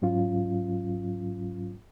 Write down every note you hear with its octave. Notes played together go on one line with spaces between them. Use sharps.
G#2 F#3 C#4 F4